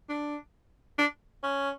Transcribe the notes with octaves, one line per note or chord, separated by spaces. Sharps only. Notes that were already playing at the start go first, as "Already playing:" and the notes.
D4
D4
C#4